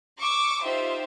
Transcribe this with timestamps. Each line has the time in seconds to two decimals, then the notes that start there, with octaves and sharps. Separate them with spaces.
0.19 C#6 D6 E6
0.65 D#4 F4 G4 C5 E5